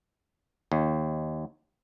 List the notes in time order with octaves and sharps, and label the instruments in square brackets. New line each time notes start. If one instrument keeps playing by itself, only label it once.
[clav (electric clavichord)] D#2